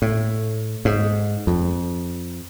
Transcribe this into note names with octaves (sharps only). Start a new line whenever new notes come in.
A2
G#2
F2